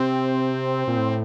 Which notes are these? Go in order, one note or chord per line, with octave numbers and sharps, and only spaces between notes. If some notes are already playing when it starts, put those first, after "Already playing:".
Already playing: C3 C4
A#2
A2